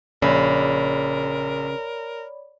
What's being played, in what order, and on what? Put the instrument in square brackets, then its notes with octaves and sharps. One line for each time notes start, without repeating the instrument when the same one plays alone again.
[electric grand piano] A#1 [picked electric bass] C#3 [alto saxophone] A#4 [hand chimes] C#5 D5 B5